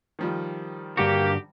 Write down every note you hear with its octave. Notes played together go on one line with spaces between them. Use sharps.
D#3 F3 G3
G2 D3 A#3 F#4 G4